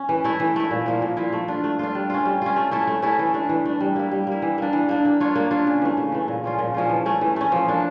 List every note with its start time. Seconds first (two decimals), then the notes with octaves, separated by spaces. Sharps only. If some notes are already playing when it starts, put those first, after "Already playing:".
Already playing: C#4
0.09 E3
0.24 A3 E4
0.40 E3
0.56 A3 E4
0.71 A#2
0.86 F3 A#3 E4
1.02 A#2
1.17 F3 A#3 E4
1.32 A3
1.48 D4 F4
1.64 A3
1.79 D4 F4
1.95 G3
2.10 C#4 F4
2.25 G3
2.42 C#4 F4
2.56 A3
2.71 C#4 E4 A4
2.87 A3
3.02 C#4 E4 A4
3.19 E3
3.34 A3 D4
3.49 E3
3.65 A3 D4
3.80 G3
3.96 A#3 E4
4.11 G3
4.27 A#3 E4
4.42 E3
4.58 A#3 D4
4.73 E3
4.89 A#3 D4
5.05 A#3
5.20 D4 F4 C#5
5.35 A#3
5.51 D4 F4 C#5
5.67 C#3
5.82 E3 A3
5.97 C#3
6.12 E3 A3
6.28 A#2
6.44 F3 C#4 F4
6.59 A#2
6.74 F3 C#4 F4
6.89 E3
7.06 A3 C#4
7.21 E3
7.36 A3 C#4
7.52 F3
7.68 A#3 D4